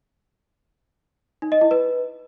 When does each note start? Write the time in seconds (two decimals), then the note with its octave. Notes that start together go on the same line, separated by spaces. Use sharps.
1.42 D#4
1.52 D#5
1.61 E4
1.71 B4